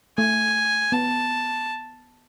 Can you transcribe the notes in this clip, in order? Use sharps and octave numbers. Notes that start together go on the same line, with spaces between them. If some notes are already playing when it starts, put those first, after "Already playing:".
A3 G#5
B3 A5